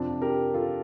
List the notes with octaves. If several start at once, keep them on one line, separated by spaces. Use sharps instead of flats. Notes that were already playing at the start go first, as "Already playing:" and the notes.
Already playing: F2 C3 F3 C4 D4
G4 A#4
F4 A4